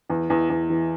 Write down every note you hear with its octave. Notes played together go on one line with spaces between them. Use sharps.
E2
E2
E2
E3